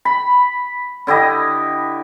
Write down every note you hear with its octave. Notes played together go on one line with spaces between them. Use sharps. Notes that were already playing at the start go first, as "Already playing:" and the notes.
B5
D3 E4 G4 D#5